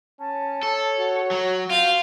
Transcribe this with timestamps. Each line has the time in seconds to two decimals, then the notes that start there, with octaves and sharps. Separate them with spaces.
0.20 C#4 A5
0.63 A4 C#5
0.97 F#4
1.31 F#3
1.71 F4 F5 G5